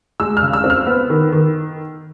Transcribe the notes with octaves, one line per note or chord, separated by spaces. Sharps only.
G#3 E6
F6
C#3
E6
C4
F6
B3
D#3
D#3